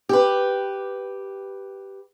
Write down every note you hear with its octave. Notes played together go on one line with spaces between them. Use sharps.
G4 B4